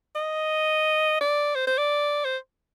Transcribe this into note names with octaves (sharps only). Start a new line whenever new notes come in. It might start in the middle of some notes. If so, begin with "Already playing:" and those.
D#5
D5
C5
C5
D5
C5